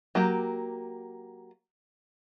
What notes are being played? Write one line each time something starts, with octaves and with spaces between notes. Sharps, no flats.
F#3 A#3 G4